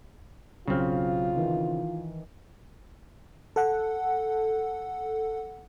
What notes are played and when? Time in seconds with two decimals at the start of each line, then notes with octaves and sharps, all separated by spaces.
0.68 B1 C#3 C4 F4 F#4 F6
1.36 D#3 E3
3.56 A4 F#5